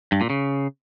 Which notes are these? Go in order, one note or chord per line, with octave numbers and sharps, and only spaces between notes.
G2
A#2
C#3